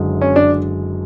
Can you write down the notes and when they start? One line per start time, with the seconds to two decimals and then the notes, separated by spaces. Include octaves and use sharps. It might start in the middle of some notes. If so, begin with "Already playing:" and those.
Already playing: F#1 F#2 D3 G#3
0.21 C#4
0.36 D4